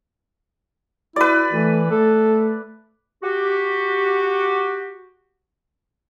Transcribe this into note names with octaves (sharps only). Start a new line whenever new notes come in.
E4 F#4 B4 D5
E3 A3
A3 A4
F#4 G4